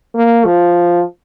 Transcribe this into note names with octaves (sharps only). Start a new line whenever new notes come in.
A#3
F3